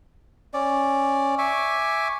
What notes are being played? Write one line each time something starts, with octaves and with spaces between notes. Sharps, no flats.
C#4 D5
E5 G#5 C#6 D6